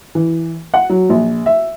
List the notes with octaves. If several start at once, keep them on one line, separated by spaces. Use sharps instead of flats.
E3
F#5
F#3
A#1
E5